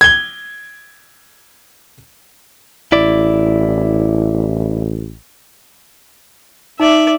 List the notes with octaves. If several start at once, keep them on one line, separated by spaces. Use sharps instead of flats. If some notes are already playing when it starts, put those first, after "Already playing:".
G#6 G7
A1 E4 D5
D#4 D5 E5